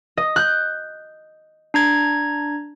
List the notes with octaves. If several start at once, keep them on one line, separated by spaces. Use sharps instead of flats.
D#5
F#6 G6
D4 A#5 G#6